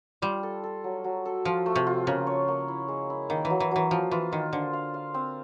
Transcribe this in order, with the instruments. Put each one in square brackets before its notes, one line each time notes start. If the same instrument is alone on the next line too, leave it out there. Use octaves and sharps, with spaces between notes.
[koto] G3 [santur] F4
[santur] A4
A4
F#3
F#3
A4
[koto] F3 [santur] F4
[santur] A3
[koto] C3
[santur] F4
[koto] C#3 [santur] A#3
[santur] C#5
A#3
E4
G#3
E4
[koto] D#3 [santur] A#3
[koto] E3
[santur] F#3
[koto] E3
[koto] E3 [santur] F#3
[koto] F3 [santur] F4
[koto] E3 [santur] F4
[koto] D#3 [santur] F4
[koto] D3 [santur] C5
[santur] F5
F5
C4